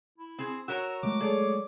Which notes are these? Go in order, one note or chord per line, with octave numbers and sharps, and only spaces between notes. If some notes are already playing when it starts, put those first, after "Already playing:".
E4
C4 G#4
F#4 A#4 C#5 E6
F#3 G#3 A3 D6
G#4 A4 C#5 D5